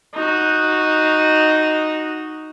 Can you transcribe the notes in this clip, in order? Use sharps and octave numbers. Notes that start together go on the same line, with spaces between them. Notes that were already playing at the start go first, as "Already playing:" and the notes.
D#4 F#4